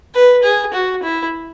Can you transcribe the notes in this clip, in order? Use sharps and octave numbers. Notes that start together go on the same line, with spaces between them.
B4
G#4
F#4
E4